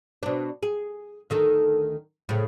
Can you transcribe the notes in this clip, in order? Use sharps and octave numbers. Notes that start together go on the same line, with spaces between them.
B2 D4
G#4
D2 D#3 A4
A2 C#3